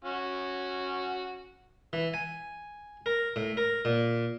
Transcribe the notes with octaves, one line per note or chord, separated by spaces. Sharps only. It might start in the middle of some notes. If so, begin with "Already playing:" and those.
C#4 F#4
E3
G#5
A#4
A2
A#4
A#2